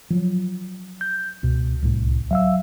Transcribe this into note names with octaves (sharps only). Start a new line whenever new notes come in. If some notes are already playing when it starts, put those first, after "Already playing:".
F3 F#3
G6
C#2 B2
C2 A2
F#3 E5 F5 E6